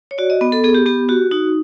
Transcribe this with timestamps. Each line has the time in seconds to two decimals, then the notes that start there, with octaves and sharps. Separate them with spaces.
0.11 C#5
0.18 F#4 D5
0.30 D#5
0.41 B3 D#5
0.52 A4
0.64 B3 G#4
0.75 G4
0.86 B3 G4
1.09 F#4 G4
1.31 D#4 F#4